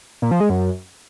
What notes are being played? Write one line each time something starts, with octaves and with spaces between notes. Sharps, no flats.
A#2
F3
G#3
F#2